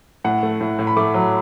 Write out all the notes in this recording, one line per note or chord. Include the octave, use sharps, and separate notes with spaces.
A2 F#5
A3
A2
A2
B5
A3 D6
F#3